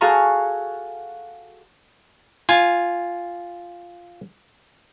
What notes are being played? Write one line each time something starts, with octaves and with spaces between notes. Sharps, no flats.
F#4 G#4 A4 F5 A#5 C#6
F4 G#5